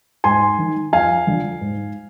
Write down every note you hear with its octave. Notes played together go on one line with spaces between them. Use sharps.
G#2 G#5 C6
D#3
F2 F5 G#5
D3 F3
G#2